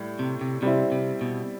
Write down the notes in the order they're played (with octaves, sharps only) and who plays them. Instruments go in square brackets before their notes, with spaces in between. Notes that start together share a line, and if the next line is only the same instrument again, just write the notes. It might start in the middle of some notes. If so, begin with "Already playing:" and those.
Already playing: [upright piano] A2 G3
[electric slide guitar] C3
C3
[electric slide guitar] C3 [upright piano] G3 C4 E4
[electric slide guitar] C3
B2